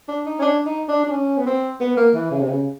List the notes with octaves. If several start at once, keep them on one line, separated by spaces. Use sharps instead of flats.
D4
D#4
C#4
D4
D#4
D4
D4
C#4
B3
C4
B3
A#3
E3
C#3
C3
C#3